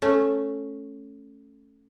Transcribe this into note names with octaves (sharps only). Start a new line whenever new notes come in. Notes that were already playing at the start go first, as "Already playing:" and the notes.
A3 C#4